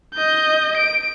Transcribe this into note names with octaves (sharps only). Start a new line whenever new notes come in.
D#5 G6
D7